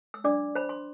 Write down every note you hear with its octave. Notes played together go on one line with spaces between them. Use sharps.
E6
D4 D5 D6
C5 B5
C6